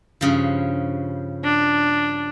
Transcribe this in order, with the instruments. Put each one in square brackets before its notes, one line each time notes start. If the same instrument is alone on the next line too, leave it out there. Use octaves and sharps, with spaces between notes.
[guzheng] G2 C#3 F3
[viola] D4